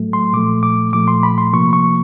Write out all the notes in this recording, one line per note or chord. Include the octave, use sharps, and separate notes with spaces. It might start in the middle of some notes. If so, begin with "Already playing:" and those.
Already playing: A2 F#3 A3
C6
A#2 F3 A3 D6
D6
A#2 F3 A3 D6
C6
B5
C6
C3 F3 A#3 C#6
C#6